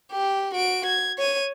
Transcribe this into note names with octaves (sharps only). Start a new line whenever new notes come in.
G4
F#4 D7
G#6
C#5 D#7